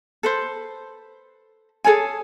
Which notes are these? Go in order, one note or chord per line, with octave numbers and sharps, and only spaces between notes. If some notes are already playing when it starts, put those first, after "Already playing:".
A4 B4 C5
G#4 A4 C#5 G#5